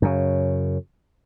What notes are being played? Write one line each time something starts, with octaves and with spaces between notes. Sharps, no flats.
F#2 C#3